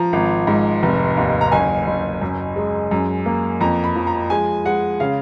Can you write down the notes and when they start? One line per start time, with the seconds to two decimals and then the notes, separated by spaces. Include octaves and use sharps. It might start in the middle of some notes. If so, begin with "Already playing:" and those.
Already playing: F3 A#5
0.13 G#1
0.47 G#2
0.83 F1
1.17 D#2
1.41 A#5
1.52 F#1 G#5
1.87 F#1
2.22 F#2
2.56 G#3
2.91 F#2
3.26 A#3
3.61 F2 A#5
3.84 B5
3.96 F3
4.07 A#5
4.30 G#3 G#5
4.65 G#3 F#5
5.00 C#3 F5